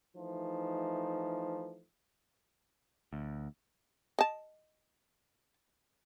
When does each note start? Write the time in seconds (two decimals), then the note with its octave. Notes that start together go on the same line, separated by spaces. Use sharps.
0.16 E3 F3 A3 D#4
3.13 D2
4.19 D#5 A5